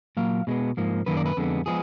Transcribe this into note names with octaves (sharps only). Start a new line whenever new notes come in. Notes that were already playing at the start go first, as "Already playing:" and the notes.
A#2 F#3 A#3 F5
B2 G#3 B3
G#2 F3 A#3
F#2 D#3 A#3 B4
D5
B4
F2 D3 G#3 B3
F3 G#3 B3 G#4